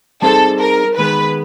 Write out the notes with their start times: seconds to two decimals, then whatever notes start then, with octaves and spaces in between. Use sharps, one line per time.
0.22 G3 C4 D#4 G#4 A4 C5
0.60 A#4
0.97 D#3 G#3 B3 B4